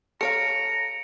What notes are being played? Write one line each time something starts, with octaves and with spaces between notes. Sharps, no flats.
A4 C#5 F5 A#5 C#7 D7